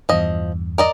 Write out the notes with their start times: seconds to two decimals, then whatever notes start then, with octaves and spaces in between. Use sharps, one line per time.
0.09 E2 G2 F3 D#5
0.78 A#4 D5 D#5